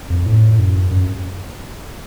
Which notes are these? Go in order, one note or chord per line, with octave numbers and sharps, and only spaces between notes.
F2
A2
F#2
F#2